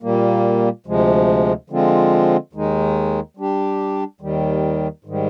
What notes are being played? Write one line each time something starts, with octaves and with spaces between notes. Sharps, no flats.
A#2 G3 A#3
D2 C3 F3 G#3
D3 F3 G#3 C4 F4
D#2 D#3 G#3 D#4
G3 D4 G4
D#2 D#3 G3
G#2 D#3 G3